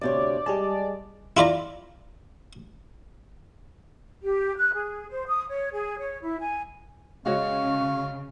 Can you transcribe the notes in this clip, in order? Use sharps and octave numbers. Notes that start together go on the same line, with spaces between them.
D2 C3 C#5 D5
G3 G#3 G#4 A5
E4 F4 D5 A#5
G4
F#6
G#4
C5
D#6
C#5
G#4
C#5
E4
G#5
C#3 G#3 F#4 C#5 F5 C#6